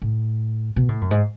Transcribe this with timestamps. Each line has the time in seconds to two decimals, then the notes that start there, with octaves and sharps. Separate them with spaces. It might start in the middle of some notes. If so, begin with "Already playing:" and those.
0.02 A2
0.76 B2
0.89 A2
1.01 F#2
1.11 G#2